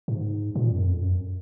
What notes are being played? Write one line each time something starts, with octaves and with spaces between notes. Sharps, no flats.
G#2
A#2
F#2
F2
F#2